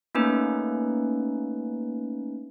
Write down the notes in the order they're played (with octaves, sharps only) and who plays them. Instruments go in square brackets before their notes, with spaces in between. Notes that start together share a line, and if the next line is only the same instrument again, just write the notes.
[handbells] A3 A#3 C#4 D#4 B4